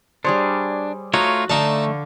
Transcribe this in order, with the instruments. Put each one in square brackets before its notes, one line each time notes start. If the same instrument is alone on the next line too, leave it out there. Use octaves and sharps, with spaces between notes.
[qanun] G3 G#4 C#5 [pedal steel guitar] D4 [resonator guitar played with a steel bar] C5
[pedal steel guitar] A3 F4 C#5 [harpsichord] D#4 [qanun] F#4
[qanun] D3 F5 C#6 [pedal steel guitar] A3 [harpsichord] D#4 A5 [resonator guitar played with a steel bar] D5